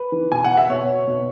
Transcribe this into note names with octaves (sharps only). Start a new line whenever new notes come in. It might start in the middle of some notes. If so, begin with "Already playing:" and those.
Already playing: B4
E3
B2 G#5
F#5
E5
B2 C#5
B2